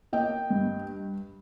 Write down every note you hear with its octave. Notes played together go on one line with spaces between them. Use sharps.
A#3 D#5 G5
G2